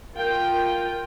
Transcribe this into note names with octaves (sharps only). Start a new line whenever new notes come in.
F4 A#4 G5